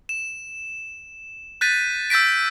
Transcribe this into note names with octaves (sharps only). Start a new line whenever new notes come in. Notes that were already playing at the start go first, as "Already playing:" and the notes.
E7
F#6 G6 A6 B6 D#7
E6 G6 A6 B6 D7